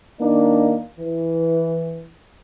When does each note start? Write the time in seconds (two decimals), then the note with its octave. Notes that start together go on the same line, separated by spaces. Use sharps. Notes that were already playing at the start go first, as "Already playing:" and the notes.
0.19 D#3 A#3 D4 D#4
0.99 E3